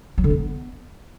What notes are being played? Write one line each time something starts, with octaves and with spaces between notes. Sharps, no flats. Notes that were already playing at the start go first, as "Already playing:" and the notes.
F#3
D3
B3